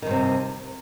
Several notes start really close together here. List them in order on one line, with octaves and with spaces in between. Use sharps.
D#3 G2 C3